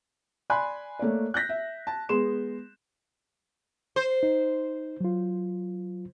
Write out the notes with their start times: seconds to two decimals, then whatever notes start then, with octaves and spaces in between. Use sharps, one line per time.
0.50 D5 G#5 B5 C6 F#6
0.99 A3 A#3 C#5 D5
1.34 F#6 G6 A#6 B6
1.49 E5
1.87 A5
2.09 G#3 B3 G#4 C6 E7
3.96 C5
4.23 D#4
5.00 F#3 F4